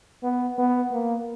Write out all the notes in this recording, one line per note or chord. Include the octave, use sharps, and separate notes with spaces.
B3
B3
A#3